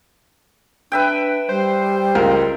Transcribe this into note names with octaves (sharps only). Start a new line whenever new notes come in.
D4 B4 E5 G5
G3 C5
C#2 A#4